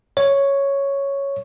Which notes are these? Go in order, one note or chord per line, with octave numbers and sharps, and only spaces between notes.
C#5